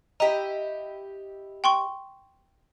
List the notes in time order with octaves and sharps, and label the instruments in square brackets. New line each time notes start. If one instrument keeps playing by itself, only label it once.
[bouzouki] E4 G4 D#5 [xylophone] A#5
[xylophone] G5 C6 C#6